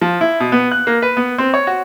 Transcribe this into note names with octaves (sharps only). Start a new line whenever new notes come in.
F3
E4
B2
B3
F#6
A#3
B4
B3
C4
C#5
F#4